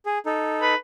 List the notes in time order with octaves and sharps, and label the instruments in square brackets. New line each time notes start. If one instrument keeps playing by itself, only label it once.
[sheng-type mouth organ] G#4
D#4 A4
[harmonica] B4